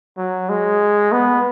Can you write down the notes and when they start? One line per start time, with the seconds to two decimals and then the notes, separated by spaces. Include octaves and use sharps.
0.18 F#3
0.49 G#3
1.12 B3